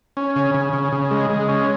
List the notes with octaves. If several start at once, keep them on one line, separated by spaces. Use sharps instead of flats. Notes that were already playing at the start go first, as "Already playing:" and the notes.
C#4
C#3
C#3
C#3
C#3
G#3
G#3
C#4